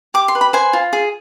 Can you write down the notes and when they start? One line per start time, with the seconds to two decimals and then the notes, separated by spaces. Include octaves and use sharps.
0.14 G4 D6
0.28 C6
0.35 B4
0.41 B5
0.53 C5 G#5
0.73 F4
0.93 G#4